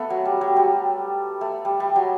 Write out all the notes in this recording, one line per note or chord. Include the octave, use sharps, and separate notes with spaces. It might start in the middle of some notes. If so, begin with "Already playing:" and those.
Already playing: A3 B3
F#3
G3
F#3
G3
A3
G3
G3
F#3